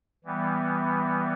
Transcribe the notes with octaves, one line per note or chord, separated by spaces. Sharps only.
E3 G3 B3